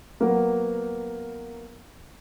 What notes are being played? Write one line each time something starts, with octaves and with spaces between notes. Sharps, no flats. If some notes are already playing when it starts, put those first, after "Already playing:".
F#3 A#3 B3 A#4 B4 F#5